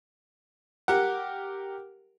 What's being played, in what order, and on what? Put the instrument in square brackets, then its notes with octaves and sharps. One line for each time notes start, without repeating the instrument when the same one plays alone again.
[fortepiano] G4 A#4 F#5